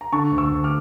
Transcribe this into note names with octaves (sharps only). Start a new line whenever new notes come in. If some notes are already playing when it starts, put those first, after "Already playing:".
A#5
D3 A5 C#6
D2
C#6 E6
D2
D6 F6